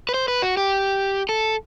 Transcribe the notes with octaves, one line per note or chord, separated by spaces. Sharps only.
B4
C5
B4
F#4
G4
A4